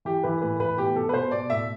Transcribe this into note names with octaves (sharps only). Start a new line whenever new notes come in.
E3 G4
E3 B4
A2 B4
E3 B4
B2 G4
B2 A4
B4
B2 C5
B2 D5
A2 E5